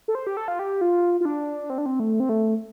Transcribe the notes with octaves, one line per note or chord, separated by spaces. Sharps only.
A4
C5
G4
A4
F4
G4
F4
F4
D4
C4
D4
C4
A3
C4
A3